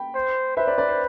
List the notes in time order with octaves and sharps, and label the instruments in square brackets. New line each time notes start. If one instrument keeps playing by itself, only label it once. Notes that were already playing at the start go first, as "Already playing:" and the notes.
Already playing: [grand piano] G5 B5
[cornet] C5
[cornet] B4 [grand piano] C5 E5
[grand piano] D5
D5
C5